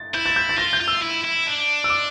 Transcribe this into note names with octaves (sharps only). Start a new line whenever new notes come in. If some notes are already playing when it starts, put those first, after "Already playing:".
Already playing: A6
E4 G6
A6
G6
A6
F4 A#6
G6
F4
E6
E4
E4
D4
E6
D6